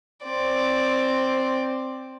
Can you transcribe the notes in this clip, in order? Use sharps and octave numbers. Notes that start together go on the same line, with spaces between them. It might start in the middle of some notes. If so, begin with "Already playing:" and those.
C4 D5